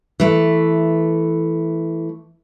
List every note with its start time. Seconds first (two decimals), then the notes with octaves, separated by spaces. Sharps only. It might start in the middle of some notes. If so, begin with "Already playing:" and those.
0.20 E3 A3